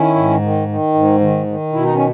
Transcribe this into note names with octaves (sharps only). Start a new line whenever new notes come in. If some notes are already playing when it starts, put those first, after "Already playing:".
Already playing: D#3 C#4 E4
G#2
D#3
D#3
G#2
D#3
D#3
B2 E4
D#4
C#4